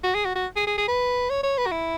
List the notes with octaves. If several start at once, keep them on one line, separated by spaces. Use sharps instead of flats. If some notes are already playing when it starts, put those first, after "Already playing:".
F#4
G#4
F#4
F#4
G#4
G#4
G#4
B4
C#5
C#5
B4
F#4
E4